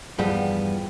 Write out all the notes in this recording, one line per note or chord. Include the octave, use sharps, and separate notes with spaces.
E2 G2 F3 G3 B3 G5